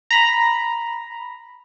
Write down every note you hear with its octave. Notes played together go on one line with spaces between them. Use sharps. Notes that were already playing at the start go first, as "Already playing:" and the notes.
A#5 B5